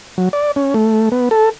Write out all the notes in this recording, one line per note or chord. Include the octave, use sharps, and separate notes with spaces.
F#3
D5
C#4
A3
B3
A4